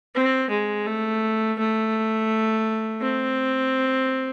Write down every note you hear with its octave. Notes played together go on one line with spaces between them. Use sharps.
C4
G#3
A3
A3
C4